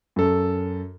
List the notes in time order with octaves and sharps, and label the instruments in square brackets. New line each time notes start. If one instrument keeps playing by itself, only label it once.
[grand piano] F#2 A4